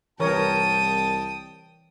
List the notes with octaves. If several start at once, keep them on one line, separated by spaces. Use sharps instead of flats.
C2 E3 A#4 C#5 G5 A5 D#6